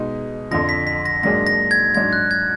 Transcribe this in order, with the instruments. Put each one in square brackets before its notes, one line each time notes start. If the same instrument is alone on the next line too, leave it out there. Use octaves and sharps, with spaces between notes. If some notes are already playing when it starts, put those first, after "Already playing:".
Already playing: [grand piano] B2 G#3 D#4 G#4
[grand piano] F2 D3 F3 [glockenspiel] A#6
[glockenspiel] B6
B6
A#6
[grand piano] G#2 F#3 A#3 D4 G#4 [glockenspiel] A#6
[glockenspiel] A#6
G#6
[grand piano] G#2 F#3 D4 [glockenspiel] G#6
[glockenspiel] F#6
G#6